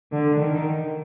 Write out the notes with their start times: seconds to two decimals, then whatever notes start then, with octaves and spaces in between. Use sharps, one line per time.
0.12 D3
0.40 D#3